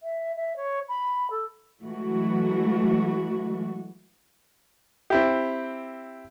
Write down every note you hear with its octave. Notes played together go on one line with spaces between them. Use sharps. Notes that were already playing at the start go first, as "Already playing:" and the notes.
E5
E5
C#5
B5
A4
E3 F#3 G#3 A3 F#4
C4 E4 G4